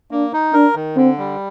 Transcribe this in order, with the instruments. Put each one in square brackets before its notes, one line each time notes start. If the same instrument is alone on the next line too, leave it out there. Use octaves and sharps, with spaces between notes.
[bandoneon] A#3 [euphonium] D4
[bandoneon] D#4
[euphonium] D4 [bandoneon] A#4
[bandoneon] D#3
[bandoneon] D3 [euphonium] C4
[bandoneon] G3